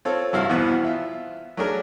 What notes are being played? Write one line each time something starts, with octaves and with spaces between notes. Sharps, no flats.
C4 F4 A4 C#5
C2 G2 E4 F#4 F5
E2 B2 E3 B3 C4
F4 E5
F#3 A3 D4 G#4 A#4